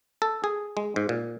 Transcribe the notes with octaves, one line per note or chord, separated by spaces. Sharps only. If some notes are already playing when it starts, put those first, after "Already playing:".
A4
G#4
G#3
G#2
A#2